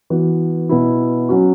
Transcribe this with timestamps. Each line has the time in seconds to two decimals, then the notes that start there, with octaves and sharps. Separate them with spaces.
0.10 E3 B3 F#4
0.69 B2 B3 E4
1.29 F#3 C#4 F#4